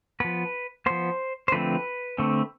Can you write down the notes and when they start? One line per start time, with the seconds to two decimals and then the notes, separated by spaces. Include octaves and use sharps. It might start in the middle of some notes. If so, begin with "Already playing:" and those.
0.20 F3 B3 B4
0.86 F3 B3 C5
1.48 C5
1.52 D3 F3 A3 C4 B4
2.18 D3 A3 C4